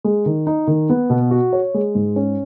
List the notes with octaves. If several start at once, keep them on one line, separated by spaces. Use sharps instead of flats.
G#3
D#3
D#4
D#3
B3
B2
F#4
C#5
G#3
G#2
C#4